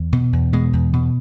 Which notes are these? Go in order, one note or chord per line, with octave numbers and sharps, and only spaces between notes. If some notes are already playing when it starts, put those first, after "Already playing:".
Already playing: E2
B2
E2
B2 G#3
E2
B2